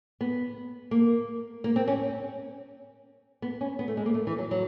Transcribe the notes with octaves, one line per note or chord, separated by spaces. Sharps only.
B3
A#3
A#3
C4
C#4
B3
C#4
B3
A3
G#3
A#3
A3
E3
F#3
F#3